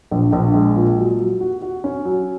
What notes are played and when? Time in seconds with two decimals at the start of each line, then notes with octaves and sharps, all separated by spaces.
0.11 A#1
0.33 A#1
0.54 G#3
0.76 A#2
0.97 F#3
1.19 F#3
1.41 F#4
1.62 F#4
1.84 C#4
2.05 F#3